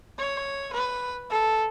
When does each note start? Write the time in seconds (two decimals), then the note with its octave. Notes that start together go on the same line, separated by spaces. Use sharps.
0.19 C#5
0.73 B4
1.30 A4